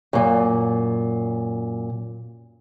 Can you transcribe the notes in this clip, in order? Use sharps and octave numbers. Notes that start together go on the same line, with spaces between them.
F#2 A#2